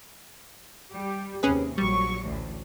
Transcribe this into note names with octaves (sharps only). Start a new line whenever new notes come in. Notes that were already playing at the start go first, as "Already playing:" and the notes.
G3 G4
D#2 C3 C#4 G#4 B4
A#1 F#3 G3 C#6
A1 D2 A2